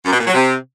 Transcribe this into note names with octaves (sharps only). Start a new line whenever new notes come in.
F#2
B2
A#2
F#3
C3